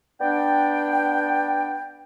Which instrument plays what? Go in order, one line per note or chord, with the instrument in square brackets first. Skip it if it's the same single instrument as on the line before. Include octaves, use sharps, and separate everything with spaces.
[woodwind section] B3 D4 D5 G5